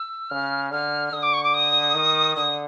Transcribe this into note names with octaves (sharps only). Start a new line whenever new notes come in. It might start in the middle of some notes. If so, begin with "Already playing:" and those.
Already playing: E6
C#3 F6
D3 F6
D3 D#6
D6
C#6
D6
D#6
D#3
D3 D#6